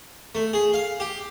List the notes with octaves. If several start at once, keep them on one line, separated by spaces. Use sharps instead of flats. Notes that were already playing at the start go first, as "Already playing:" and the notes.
A3
G#4
F5
G4